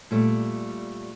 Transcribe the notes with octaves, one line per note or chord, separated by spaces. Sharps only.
A#2 G3 A3